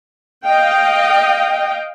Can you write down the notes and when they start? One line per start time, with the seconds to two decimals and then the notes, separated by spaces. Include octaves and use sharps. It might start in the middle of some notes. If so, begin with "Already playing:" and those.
0.46 D#5 F5 G5